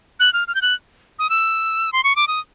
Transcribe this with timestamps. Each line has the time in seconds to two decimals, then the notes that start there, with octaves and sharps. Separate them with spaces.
0.20 F#6
0.33 F6
0.48 F6
0.55 G6
0.62 F#6
1.19 D#6
1.30 E6
1.93 C6
2.04 C#6
2.16 D6
2.28 D#6